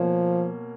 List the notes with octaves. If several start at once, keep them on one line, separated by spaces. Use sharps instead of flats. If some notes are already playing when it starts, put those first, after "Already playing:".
Already playing: B2 F3 A#3 C#4